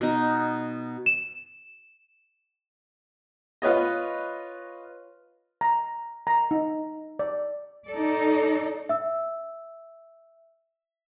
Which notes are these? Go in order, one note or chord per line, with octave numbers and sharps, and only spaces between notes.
B2 D#4
E7
F4 B4 C#5 D#5
A#5
A#5
D#4
D5
D#4 A4 D5
E5 E6